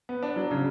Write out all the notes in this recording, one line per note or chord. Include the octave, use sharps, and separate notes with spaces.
B3
D4
F#3
C#3